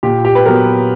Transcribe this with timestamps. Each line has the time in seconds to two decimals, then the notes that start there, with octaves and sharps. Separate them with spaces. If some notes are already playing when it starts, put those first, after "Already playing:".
0.03 A#2 G4
0.25 G4
0.35 B4
0.46 F#3 B3 A#4